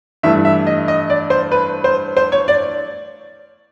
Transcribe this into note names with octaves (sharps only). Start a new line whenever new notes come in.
G2 E3 A3 E5
E5
D#5
D#5
D5
C5
B4
C5
C5
C#5
D5